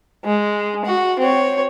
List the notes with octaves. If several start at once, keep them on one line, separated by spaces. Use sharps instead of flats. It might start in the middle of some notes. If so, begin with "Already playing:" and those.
G#3
F#4
C4 C#5